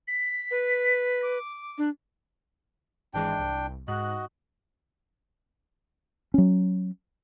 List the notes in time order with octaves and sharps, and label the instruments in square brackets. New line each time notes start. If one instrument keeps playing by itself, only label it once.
[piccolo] B6
[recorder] B4
[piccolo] D6
[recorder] D4
[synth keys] G#1 E3 G#3 [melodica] D4 G5
[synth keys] C2
[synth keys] G#2 F#6 [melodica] F#4 D#5
[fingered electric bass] F#3 C#4